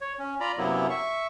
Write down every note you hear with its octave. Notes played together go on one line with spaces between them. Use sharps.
C#5
C#4
F4 D5 A#5 B5
F#2 C3 F#3 A#3 B3 E4
E5 C#6